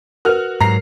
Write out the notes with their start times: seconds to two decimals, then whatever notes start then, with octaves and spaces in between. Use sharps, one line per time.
0.25 F#4 A#4 B4 F6
0.61 G#2 F#3 A#5 C7